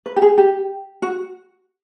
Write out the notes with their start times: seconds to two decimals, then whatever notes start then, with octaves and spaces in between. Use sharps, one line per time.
0.06 B4
0.16 G4
0.22 G#4
0.38 G4
1.02 F#4